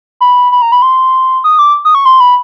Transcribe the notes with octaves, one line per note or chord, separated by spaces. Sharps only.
B5
B5
A#5
B5
C6
D#6
D6
D#6
C#6
C6
B5